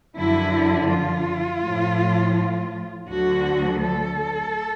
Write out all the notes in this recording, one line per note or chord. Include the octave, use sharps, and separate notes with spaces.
F#2 D3 F3 E4
F4
A2 F3
D2 D3 F#3 F#4
A4